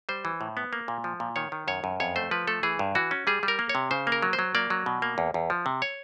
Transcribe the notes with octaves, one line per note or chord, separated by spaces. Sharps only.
G3 C5
E3
A2
B3
A#3
A#2
F3
A#2
D#3 C#5
D#3
F#2 C#5
F#2
F2 C#5
A3 C5
F3 B4
A3 A4
E3 G#4
G2
E3 F#4
C#4
G3 G#4
G3
A#4
A#3
C#5
C3
C#3 C5
A#3
A#4
F#3
C5
F#3
A#3 D5
F#3
B2
A#3
E2
E2
F3
C3
C#5